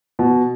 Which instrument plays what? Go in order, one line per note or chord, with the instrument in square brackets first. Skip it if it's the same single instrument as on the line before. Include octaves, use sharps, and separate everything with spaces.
[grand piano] B2